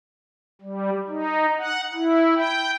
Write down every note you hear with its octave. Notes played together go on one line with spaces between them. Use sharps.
G3
D#4
F#5
E4
G5